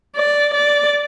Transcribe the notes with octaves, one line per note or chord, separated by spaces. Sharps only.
D5
D5